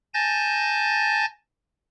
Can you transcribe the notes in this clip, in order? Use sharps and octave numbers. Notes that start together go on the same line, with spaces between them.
G#5 A5 G6 A6 A#6